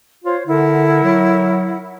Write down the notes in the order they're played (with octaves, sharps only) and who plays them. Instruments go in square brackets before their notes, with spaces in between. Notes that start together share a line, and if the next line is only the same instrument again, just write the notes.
[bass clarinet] F4 [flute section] C5 C#5
[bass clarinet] D3 [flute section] E4 A#4 F#5
[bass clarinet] F#3